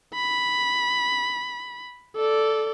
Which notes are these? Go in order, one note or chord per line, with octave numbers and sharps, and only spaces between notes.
B5
A4 D5